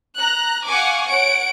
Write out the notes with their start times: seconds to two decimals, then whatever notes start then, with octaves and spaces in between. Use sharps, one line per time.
0.19 A#5 F#6
0.68 F5 F#5 G#5 C#6 D6
1.09 C#5 F#5 D7